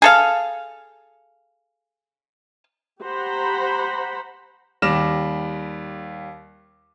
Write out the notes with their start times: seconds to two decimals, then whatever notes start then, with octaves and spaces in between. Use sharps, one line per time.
0.02 G#4 A4 F5
3.02 G4 C5 F#5 A#5 B5
4.82 D#2 G3 D6 F6 A#6 E7